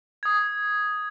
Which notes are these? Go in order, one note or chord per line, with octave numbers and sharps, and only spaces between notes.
D#6 G#6